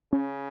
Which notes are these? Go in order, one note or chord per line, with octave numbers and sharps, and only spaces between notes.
C#3 C#4